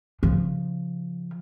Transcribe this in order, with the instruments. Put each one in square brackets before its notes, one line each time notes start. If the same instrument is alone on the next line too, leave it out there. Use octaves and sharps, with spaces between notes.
[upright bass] C#3 F3